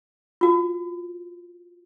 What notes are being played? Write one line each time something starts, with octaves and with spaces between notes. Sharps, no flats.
F4 F#4